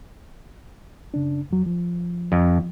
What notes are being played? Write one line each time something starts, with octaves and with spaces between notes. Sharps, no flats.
F#2 C#3 D4
F2 F#3
F3
F2